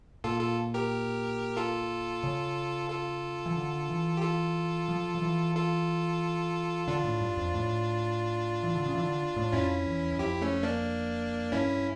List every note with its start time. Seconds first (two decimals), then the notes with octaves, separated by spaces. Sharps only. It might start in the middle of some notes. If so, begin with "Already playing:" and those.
0.24 A#2 F4 A4
0.40 F4 A4
0.74 G4 A#4
1.57 F4 A4
2.23 C#3
2.89 F4 A4
3.46 E3
3.56 D3
3.89 E3
4.17 G4
4.22 F4 A4
4.89 F3
5.15 F3
5.22 E3
5.55 F4 A4
6.87 D3 D4 F4
7.04 A2
7.21 G2
7.37 F2
7.54 A2
8.63 E3
8.75 D3
8.86 C#3
8.95 E3
9.03 D3
9.37 A2
9.52 F2 C#4 E4
9.86 E2
10.12 E2
10.19 F2 E4 G4
10.42 A3 C#4
10.63 A#3 D4
11.52 G2 C#4 E4